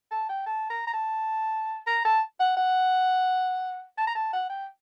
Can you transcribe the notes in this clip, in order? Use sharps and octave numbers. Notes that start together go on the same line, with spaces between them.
A5
G5
A5
A#5
A#5
A5
A#5
A5
F#5
F#5
A5
A#5
A5
F#5
G5